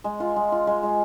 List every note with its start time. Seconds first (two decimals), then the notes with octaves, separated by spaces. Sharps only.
0.04 G#3
0.20 F4
0.36 G#3
0.52 F4
0.67 G#3
0.83 G#3